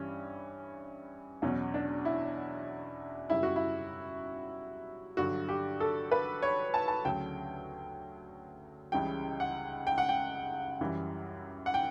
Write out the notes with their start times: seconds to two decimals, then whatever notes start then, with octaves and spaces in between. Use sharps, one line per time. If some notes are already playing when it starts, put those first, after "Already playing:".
Already playing: G2 E3 G3 C#4
1.42 E2 B2 F#3 C#4
1.74 D4
2.05 E4
3.30 F#2 C#3 G3 E4
3.43 F#4
3.56 E4
5.17 G2 D3 F#3 F#4
5.49 G4
5.80 A4
6.12 B4
6.42 C#5
6.74 A5
6.88 A5
7.05 D2 C#3 F#3 G5
8.92 C#2 C#3 E3 G3 G5
9.40 F#5
9.87 G5
9.98 F#5
10.09 G5
10.81 F#2 E3 G3
11.66 F#5
11.74 G5